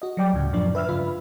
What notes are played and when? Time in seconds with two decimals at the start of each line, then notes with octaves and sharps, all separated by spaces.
0.02 F#4 D#5
0.17 F#3 G3 D5 G5 D6
0.33 D2 A2 C#3
0.53 F#2 A#2 F3 D4 D5
0.75 B4 E5 E6 F6
0.88 G2 C#3 F4 B5